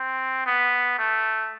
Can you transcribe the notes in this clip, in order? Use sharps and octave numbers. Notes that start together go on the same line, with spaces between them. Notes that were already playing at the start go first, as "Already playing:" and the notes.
Already playing: C4
B3
A3